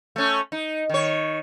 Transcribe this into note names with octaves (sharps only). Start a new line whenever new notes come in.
A3 C#4
D#4
D#3 C#5